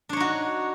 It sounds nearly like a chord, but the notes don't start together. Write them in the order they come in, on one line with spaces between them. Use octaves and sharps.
D4 C#5 D#4 F#4